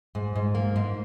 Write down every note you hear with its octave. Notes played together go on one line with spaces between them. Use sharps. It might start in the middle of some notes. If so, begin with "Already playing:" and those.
G#2
G#2
A#3
G#2